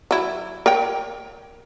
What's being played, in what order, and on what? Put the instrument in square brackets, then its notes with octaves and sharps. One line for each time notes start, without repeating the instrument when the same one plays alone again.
[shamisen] F#3 E4
A#4 C#5 G5